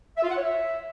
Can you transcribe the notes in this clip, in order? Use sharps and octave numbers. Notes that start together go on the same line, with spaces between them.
E5
F4
F#5
C#5
E5